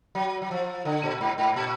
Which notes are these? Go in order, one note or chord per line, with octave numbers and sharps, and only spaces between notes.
F#3
F#3
F3
D3
A#2
G#2
G#2
A#2